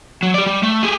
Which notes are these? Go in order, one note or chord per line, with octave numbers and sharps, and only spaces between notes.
F#3
G4 D5
G3
A3
G4 G#4